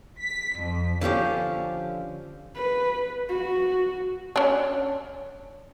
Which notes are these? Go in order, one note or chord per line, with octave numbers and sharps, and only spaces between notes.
B6
F2
D3 F3 C#4 G4
B4
F#4
C#4 D4